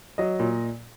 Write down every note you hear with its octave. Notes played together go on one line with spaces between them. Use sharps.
F#3 D#5
A#2